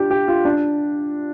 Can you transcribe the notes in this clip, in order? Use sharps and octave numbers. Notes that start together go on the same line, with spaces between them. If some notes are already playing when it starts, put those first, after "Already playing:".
Already playing: D4 F4 G4
G4
F4
D4